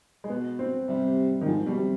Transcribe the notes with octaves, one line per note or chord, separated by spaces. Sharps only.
G#3
B2 B3
C4
C3 G3
D#3
G#2 F3
B2 G3
C3